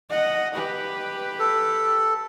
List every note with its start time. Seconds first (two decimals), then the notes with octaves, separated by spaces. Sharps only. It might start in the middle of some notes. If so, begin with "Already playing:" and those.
0.10 D#5 F#5
0.55 G4 B4
1.39 A4